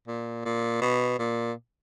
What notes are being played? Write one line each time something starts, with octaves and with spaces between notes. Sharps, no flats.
A#2
A#2
B2
A#2